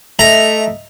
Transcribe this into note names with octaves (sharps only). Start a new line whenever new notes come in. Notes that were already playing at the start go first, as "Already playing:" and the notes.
A3 D#5 E5 A#5